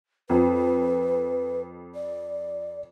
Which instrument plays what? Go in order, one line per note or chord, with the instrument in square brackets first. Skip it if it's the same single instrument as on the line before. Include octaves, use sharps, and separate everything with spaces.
[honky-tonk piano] F2 [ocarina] B4
[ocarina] D5